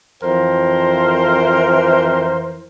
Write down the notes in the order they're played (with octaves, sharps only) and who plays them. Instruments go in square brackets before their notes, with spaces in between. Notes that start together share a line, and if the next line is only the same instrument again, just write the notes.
[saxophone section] F2 E3 A#4 C5